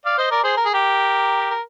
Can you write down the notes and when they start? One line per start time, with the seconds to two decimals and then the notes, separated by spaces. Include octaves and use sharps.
0.05 D5 F5
0.18 C5 D#5
0.31 A#4 D5
0.44 G#4 C5
0.57 A#4
0.65 G#4
0.73 G4 A#4
1.51 A#4